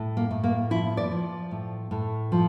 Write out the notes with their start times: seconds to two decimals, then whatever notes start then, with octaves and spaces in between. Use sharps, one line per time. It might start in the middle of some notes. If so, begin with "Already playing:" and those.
Already playing: A2
0.17 A#3
0.31 A2
0.44 A#3
0.70 F3 E4
0.97 D5
1.11 F3
1.51 A2
1.91 A2
2.32 F3